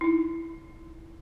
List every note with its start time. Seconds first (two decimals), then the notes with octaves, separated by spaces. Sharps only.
0.01 D#4 E4